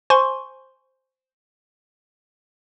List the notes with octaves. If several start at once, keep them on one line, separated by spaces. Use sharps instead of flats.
C5 G#5 C6 C#6